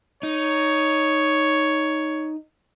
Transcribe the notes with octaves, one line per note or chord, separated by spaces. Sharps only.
D#4 C#5